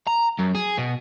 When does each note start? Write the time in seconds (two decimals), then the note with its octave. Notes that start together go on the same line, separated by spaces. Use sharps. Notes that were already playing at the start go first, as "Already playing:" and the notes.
0.07 A#5
0.39 F#2
0.55 G#4
0.78 B2